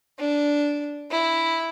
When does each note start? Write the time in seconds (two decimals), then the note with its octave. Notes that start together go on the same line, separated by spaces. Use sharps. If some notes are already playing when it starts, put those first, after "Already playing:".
0.19 D4
1.11 E4